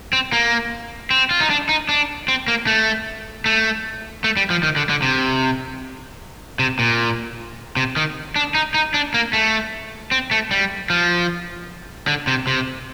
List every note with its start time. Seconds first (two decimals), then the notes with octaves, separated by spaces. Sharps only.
0.13 C4
0.33 A#3
1.11 C4
1.31 F4
1.41 D#4
1.50 D4
1.69 D#4
1.89 D4
2.28 C4
2.48 A#3
2.67 A3
3.46 A3
4.24 A3
4.37 G3
4.50 F3
4.63 D#3
4.76 D3
4.89 D3
5.02 C3
6.59 C3
6.79 A#2
7.77 C3
7.96 D#3
8.36 D4
8.54 D#4
8.74 D#4
8.94 D4
9.14 A#3
9.33 A3
10.11 C4
10.31 A3
10.51 G3
10.90 F3
12.07 D3
12.27 C3
12.47 C3